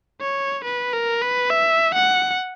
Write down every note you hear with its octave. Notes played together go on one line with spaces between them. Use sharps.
C#5
B4
A#4
B4
E5
F#5